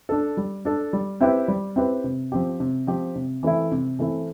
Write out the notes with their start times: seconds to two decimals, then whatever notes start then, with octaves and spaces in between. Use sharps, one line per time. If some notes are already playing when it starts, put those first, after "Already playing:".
0.09 D4 A4
0.37 G3
0.65 D4 A4
0.93 G3
1.21 C4 E4 G4 B4
1.48 G3
1.76 C4 E4 G4 B4
2.04 C3
2.32 F3 C4 G4
2.60 C3
2.87 F3 C4 G4
3.16 C3
3.43 E3 A3 C4 E4
3.72 C3
3.99 E3 A3 C4 E4